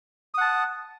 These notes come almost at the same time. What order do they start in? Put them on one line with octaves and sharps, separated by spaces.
D#6 F#5 A5